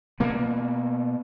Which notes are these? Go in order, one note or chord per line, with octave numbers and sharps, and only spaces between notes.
B2 A#3 B3